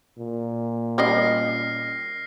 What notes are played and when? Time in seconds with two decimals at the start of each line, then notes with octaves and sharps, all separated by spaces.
0.18 A#2
0.98 G3 C#4 D#5 F6 A#6 C7